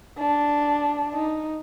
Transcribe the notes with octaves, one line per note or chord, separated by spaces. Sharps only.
D4
D#4